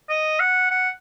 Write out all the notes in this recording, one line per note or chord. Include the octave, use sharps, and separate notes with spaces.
D#5
F#5
F#5